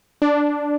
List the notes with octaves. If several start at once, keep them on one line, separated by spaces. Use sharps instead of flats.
D4